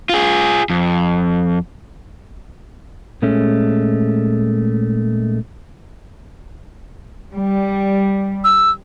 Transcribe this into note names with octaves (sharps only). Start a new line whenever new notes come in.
F4 G#4
F2
A#2 G#3 A3 C#4
G3
E6